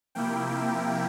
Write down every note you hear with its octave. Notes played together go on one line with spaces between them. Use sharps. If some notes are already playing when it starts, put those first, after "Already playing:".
C3 F3 A#3 E4 G5